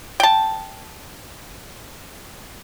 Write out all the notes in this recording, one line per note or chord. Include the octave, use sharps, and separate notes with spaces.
G5 A5